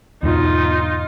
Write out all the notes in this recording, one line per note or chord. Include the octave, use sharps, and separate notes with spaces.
E2 G#2 B2 D#4 F4